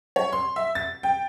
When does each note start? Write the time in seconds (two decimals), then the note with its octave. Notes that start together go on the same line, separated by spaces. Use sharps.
0.16 C#5
0.33 C6
0.56 E5
0.75 A6
1.03 G5